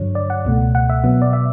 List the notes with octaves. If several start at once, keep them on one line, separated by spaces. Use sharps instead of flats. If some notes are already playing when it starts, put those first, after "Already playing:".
Already playing: G2 D3 F#3 C#5
D5
F#5
C#2 B2 A3
F#5
E5
B2 F#3 B3
D5
E5